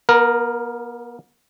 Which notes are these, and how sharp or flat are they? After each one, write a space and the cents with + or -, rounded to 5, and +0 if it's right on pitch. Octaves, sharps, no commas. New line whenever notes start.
B3 -45 A#4 +0